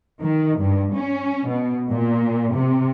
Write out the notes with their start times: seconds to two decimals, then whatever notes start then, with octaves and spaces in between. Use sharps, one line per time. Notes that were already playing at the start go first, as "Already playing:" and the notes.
0.23 D#3
0.59 G2
0.94 C#4
1.48 B2
1.91 A#2
2.55 C3